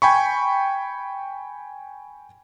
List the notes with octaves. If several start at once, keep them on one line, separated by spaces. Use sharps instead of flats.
G5 G#5 B5 C#6